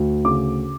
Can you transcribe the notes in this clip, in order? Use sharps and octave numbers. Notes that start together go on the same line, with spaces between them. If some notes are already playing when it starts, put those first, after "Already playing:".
Already playing: D2
C#3 D6